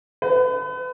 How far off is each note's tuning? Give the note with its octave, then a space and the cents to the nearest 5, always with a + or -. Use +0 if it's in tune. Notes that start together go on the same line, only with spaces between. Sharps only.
B4 +35